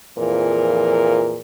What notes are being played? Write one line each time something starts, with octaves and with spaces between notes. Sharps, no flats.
F2 A#2 E3 F3 G#4 A#4